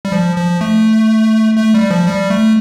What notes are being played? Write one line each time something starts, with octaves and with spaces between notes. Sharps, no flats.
G3
F3
F3
A3
A3
G3
F3
G3
A3